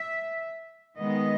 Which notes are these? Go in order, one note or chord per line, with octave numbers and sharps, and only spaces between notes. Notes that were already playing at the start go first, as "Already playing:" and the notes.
Already playing: E5
D#3 G#3 B3 D#5